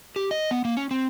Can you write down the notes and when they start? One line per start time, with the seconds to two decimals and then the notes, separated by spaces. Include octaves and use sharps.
0.16 G4
0.31 D#5
0.51 B3
0.65 A#3
0.77 C#4
0.91 C4